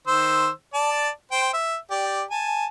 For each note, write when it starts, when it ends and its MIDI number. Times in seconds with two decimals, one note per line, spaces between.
0.07 0.49 51
0.07 0.49 72
0.07 0.49 88
0.74 1.09 74
0.74 1.09 81
1.32 1.51 72
1.32 1.51 79
1.53 1.77 76
1.91 2.22 67
1.91 2.22 74
2.31 2.66 80
2.31 2.66 81